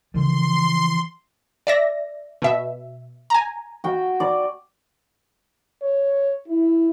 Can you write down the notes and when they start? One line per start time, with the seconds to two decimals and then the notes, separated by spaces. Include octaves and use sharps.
0.14 C#3 E3 F3 C6
1.67 D5 E5 A#6
2.42 B2 E5
3.30 G#5 A#5
3.84 F#4 G5
4.20 D5
5.82 C#5
6.48 E4